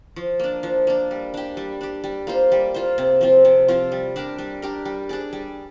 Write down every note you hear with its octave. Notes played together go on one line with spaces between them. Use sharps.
F3
A#3 D4
F3
A#3 D4
G3
D4 G4
G3
D4 G4
G3
A#3 F4 C5
G3
A#3 F4 C5
C3
F3 C4 F4
C3
F3 C4 F4
G3
D4 G4 A#4
G3
D4 G4 A#4
G3
D4 G#4 D5
G3